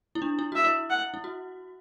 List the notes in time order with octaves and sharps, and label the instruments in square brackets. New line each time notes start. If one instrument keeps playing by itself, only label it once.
[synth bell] E4
D4
E4
[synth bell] F#4 [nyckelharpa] E5
[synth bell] E4
[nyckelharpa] F#5
[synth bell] E4
F#4